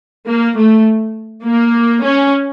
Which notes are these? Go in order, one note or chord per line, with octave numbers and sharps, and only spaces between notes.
A#3
A3
A#3
C#4